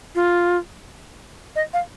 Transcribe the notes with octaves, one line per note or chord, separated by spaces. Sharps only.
F4
D#5
F5